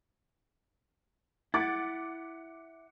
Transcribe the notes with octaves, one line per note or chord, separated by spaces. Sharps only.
E4 F#5 D6 A6